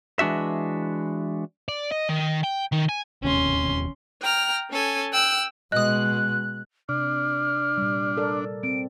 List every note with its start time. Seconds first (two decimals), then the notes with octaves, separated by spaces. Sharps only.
0.19 E3 G#3 D4 F#4 E5
1.68 D5
1.91 D#5
2.09 D#3
2.43 G5
2.72 D#3
2.89 G#5
3.23 E1 D#2 C3 C#4 C6
4.22 G5 A#5 F6
4.71 C#4 A4 G#5
5.13 G5 E6 F#6
5.72 B2 G#3 D#5 D#6 F#6
6.89 C3 D4 F6
7.78 A#2 G3
8.17 A4 A#4 D5
8.63 C4 D7